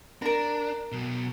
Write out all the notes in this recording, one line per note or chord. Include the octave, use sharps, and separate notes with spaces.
D4 A#4 A#5
B2 F#3